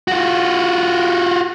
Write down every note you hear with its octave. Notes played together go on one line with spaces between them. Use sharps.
F4 F#4